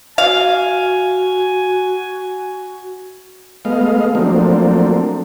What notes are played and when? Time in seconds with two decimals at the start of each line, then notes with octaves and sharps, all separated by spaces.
0.18 F#4 F5 G#5
3.65 G#3 A3 B3 D#5 F5
4.15 F3 F#3 A3 A#3 C4 D4